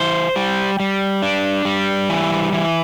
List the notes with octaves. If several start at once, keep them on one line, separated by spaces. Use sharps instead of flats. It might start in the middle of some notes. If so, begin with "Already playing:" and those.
Already playing: E3 C5
G3
G3
D4
G3
E3
E3